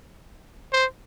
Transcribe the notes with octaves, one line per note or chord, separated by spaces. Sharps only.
C5